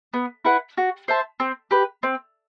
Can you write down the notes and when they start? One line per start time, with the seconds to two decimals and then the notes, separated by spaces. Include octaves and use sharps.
0.14 B3
0.45 E4 B4 F#5
0.78 F#4
1.08 C5 E5 A5
1.40 C4
1.71 G4 B4
2.03 C4